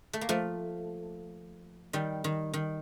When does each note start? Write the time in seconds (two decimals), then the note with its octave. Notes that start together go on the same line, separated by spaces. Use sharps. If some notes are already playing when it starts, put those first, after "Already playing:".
0.13 A3
0.21 A#3
0.29 F3 A3
1.93 D#3 G3
2.24 D#3
2.54 D#3